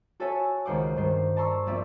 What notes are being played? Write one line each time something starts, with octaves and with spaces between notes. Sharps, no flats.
F#4 A4 C#5 E5 G#5 A5
C#2 D#3 C5 F#5 D6
G2 D#3 C5
D5 A5 A#5 C6 C#6 E6
A#1 C4 D5 E5